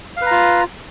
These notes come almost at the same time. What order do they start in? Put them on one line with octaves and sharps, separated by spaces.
F5 B4 A#5 F4